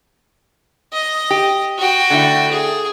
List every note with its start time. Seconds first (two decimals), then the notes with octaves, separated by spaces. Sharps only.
0.93 D#5
1.30 G4
1.78 F#4 G5
2.10 D3 A3 E4
2.52 G#4